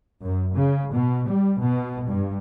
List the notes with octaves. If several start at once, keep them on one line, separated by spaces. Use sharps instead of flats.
F#2
C#3
B2
G3
B2
G2